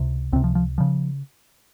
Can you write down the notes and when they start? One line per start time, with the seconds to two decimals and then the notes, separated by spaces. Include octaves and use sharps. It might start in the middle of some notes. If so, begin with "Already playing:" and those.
Already playing: C#2 C3
0.33 C#2 C4
0.36 C3
0.44 F3
0.55 F3
0.78 C#3 F3